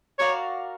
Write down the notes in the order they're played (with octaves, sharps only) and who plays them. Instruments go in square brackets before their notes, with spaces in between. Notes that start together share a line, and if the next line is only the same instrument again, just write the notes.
[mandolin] F#4 A#4 D5 F5 [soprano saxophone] C#5